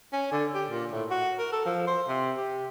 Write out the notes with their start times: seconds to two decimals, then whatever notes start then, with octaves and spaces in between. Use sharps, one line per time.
0.13 C#4
0.31 D3
0.54 G4
0.69 A#2
0.92 A2
1.10 F#4
1.39 A#4
1.52 A4
1.65 F3
1.87 C5
2.08 C3
2.37 G4